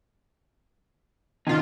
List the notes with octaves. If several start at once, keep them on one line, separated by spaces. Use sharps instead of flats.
C3 D#3 C#4 D#4 F4